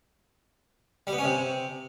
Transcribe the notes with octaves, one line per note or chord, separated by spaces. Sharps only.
G3
B3
C#4
C3